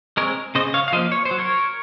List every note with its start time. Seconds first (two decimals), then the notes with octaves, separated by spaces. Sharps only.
0.17 G#3 C4 A#4 C#5
0.55 C#3 C5 D#5
0.74 C#5 F5
0.88 F5
0.92 F3 C5 D#5
0.96 A#3
1.12 C#5
1.25 C5
1.31 F#3
1.38 A#4 C#5